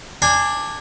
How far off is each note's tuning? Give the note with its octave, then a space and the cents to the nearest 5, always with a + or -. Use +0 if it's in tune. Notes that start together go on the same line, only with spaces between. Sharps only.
D4 +10 G#5 -20